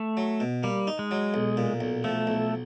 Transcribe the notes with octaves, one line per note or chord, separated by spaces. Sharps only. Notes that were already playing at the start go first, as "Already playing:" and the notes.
Already playing: A3
F#3
B2
G3 A#3
D#4
G#3
F#3
B1
A#2
B1
F3 A3
B1